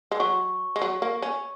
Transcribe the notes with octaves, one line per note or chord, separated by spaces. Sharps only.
G#3
F#3 C#6
G#3
F#3
A#3
C#4